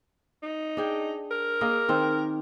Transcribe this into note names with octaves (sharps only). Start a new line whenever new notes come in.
D#4
D4 G#4 G5
A#4
A#3 G#4 D#5
D#3 C4